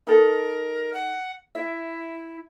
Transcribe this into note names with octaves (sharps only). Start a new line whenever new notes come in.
D#4 A4 A#4
F#5
E4 E5